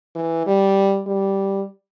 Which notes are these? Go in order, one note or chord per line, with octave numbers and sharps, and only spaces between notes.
E3
G3
G3